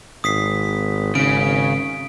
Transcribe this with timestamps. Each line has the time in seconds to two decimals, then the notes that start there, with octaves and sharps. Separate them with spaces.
0.24 G#1 D#6 B6 C7
1.15 G#1 C#3 D7